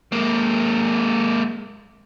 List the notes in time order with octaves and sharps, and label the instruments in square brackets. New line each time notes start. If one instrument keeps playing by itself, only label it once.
[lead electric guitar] G#3 A#3